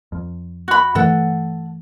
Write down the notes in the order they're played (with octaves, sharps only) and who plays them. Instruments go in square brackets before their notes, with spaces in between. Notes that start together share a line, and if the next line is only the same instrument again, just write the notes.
[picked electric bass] F2
[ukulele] F#4 B5
[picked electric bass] G2 E3 A3 [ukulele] A4 F#5